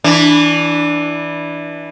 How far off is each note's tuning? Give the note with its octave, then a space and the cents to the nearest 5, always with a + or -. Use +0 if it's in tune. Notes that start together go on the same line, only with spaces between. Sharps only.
E3 -10 D4 +0